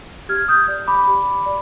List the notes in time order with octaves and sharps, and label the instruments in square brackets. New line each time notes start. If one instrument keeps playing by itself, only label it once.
[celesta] G4 F6 G#6
D#6 G6
D5
B5 D6
G4
D5